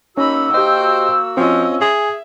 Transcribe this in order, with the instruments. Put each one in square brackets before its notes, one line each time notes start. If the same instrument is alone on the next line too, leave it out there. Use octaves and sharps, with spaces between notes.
[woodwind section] A#3 F#4 E6 [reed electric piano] C#4 [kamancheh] D#4 B5
[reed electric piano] G4 D#5 [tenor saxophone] C5 [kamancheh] G5
[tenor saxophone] F3 [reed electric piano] C4 F4 [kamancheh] C#4 D#5
[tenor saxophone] G#4 [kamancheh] E5 [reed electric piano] G#5